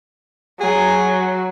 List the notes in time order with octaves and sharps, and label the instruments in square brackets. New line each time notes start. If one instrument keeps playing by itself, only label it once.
[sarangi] F#3 [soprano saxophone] G#4